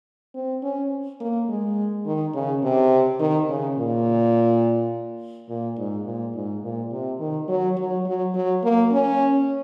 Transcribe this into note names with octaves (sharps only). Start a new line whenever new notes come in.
C4
C#4
A#3
G#3
D#3
C#3
C3
D#3
C#3
A#2
A#2
G#2
A#2
G#2
A#2
C3
D#3
F#3
F#3
F#3
F#3
A#3
C#4